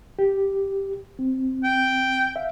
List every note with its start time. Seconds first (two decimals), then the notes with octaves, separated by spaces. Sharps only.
0.19 G4
1.19 C4
1.64 G5
2.36 E5 F5